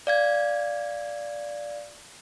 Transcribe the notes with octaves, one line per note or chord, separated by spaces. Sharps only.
D5 F5 G#6